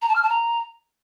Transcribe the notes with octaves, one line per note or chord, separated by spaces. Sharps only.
A#5
A5
F6
A5
A#5